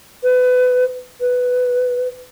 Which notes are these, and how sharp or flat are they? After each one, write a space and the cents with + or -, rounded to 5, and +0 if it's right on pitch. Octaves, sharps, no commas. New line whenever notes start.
B4 +25
B4 +10